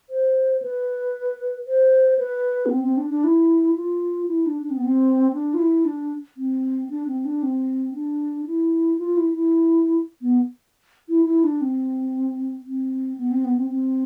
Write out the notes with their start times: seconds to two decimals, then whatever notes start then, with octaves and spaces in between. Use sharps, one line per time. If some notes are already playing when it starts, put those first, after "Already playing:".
0.10 C5
0.62 B4
1.67 C5
2.19 B4
2.66 B3
2.71 C4
2.84 C4
2.97 D4
3.10 D4
3.24 E4
3.76 F4
4.28 E4
4.46 D4
4.62 D4
4.70 C4
4.77 B3
4.85 C4
5.33 D4
5.54 F4
5.59 E4
5.85 D4
6.37 C4
6.90 D4
7.07 C4
7.25 D4
7.43 C4
7.94 D4
8.46 E4
8.99 F4
9.17 E4
9.34 E4
10.22 B3
11.09 E4
11.26 E4
11.44 D4
11.61 C4
12.66 C4
13.17 B3
13.31 C4
13.45 B3
13.57 C4
13.70 C4